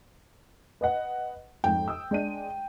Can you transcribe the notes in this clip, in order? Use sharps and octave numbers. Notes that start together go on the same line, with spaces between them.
B4 D#5 F#5
F2 G#2 G5
D#6 E6
G#3 D4 D#7